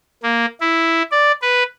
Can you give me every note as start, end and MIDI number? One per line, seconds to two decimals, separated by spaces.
0.23 0.46 58
0.61 1.03 64
1.11 1.32 74
1.42 1.63 71